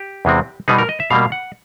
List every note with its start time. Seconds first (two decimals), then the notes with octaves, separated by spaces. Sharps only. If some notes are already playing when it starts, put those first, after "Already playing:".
Already playing: G4
0.25 E2 C3 E3 G#3 C4
0.68 B2 G3 B3 D#4 G#4
0.78 A#4
0.89 D#5
1.00 E5
1.10 B2 G3 A#3 F5
1.32 F#5